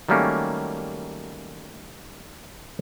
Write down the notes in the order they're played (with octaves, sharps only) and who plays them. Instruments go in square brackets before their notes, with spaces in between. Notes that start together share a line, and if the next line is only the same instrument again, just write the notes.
[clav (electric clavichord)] D#3 F#3 G3 A3 A#3 C#4